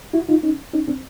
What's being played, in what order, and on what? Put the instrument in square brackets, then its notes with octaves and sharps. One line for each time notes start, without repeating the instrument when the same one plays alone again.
[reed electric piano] E4 F#4
D#4 F4
C#4 D#4
C#4 D#4
C4 D4